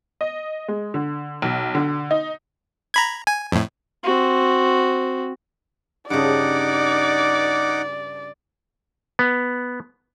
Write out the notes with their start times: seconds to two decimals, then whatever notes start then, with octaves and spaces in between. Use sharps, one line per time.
0.21 D#5
0.68 G#3
0.94 D3
1.42 B1
1.75 D3
2.11 D#4
2.94 A#5 B5 G#6
3.27 G#5
3.52 F2 A2
4.03 C4 F#4
6.10 G2 C#3 D#4 D5 F#5 D6
9.19 B3